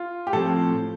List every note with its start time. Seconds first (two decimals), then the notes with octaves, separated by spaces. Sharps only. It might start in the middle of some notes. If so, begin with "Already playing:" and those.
Already playing: F4
0.27 G4
0.33 A2 F3 C4 A4